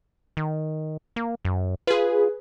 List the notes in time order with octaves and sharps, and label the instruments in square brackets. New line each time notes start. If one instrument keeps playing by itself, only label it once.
[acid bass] D#3
A#3
F#2
[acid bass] F4 [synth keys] G#4 B4